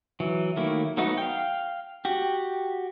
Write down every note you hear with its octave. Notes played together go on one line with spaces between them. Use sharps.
E3 F#3
D#3 F#3 A3 A#3 E4
F#3 A3 B3 D#4 F#4
F5 G5
F#4 G4